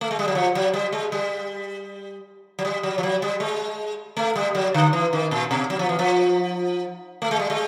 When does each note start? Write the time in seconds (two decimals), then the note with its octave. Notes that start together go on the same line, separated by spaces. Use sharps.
0.01 A3
0.11 G#3
0.19 G3
0.28 F#3
0.35 F3
0.55 F#3
0.74 G3
0.93 G#3
1.12 G3
2.59 F#3
2.65 G3
2.83 F#3
2.98 F3
3.03 F#3
3.22 G3
3.40 G#3
4.17 A3
4.36 G3
4.55 F#3
4.74 D3
4.93 E3
5.13 D#3
5.31 A#2
5.51 B2
5.70 F#3
5.79 F3
5.89 E3
5.99 F3
7.22 A3
7.31 G#3
7.39 G3
7.50 G#3